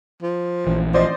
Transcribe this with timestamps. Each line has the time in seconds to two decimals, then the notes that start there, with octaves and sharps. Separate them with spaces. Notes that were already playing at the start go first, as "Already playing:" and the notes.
0.22 F3
0.67 A#1 E3
0.94 F3 C5 D5 D#5